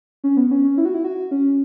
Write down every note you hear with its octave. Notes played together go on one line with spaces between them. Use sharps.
C#4
B3
C#4
C#4
E4
F#4
E4
F#4
C#4